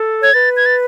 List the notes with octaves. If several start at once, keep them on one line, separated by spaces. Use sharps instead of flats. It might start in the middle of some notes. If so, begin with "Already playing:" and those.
Already playing: A4
C#5 G#6
B4 A6
G#6
A6